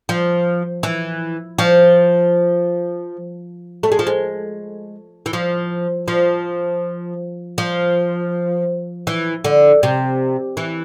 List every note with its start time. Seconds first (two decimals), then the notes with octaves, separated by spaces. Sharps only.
0.09 F3
0.83 E3
1.59 F3
3.83 A3
3.92 G#3
3.99 F3
4.07 G#3
5.26 E3
5.33 F3
6.08 F3
7.58 F3
9.07 E3
9.44 D3
9.83 C3
10.57 E3